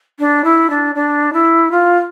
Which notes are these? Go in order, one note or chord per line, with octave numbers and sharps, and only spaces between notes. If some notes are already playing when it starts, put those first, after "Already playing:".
D4
E4
D4
D4
E4
F4